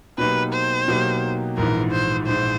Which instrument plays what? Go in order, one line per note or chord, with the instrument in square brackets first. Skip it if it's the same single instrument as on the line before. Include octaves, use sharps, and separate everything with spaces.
[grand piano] B2 F#3 A#3 D#4 G4 [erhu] B4
[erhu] C5
[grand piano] B2 F#3 A#3 D#4 G4
[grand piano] A#1 G#2 E3 [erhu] A#4
[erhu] C5
[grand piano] A#1 G#2 E3 [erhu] C5